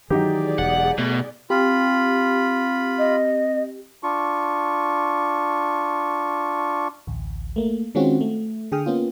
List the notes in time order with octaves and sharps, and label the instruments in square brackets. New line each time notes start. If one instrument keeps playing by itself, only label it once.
[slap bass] D#3 E3 [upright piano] F#3 D#4 G4 [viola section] G#4 D5
[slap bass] E1 [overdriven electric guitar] F#5
[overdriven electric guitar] B2 [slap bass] A3
[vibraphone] C4 [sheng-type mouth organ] F4 B5 [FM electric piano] G4
[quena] D#5
[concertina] D4 F4 C#6
[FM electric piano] A1 D2
A3 A#3
D#3 G#3 C4 C#4 F4 F#4
A3
D3 G#4 G5 D#6 F6
A#3 B3 C#4 F4